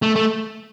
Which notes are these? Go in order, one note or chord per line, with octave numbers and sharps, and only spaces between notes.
A3
A3